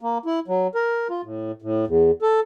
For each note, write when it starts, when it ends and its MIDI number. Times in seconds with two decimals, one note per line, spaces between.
0.01 0.18 58
0.26 0.39 64
0.48 0.67 54
0.75 1.08 70
1.10 1.21 65
1.24 1.52 45
1.62 1.85 45
1.88 2.11 40
2.22 2.40 69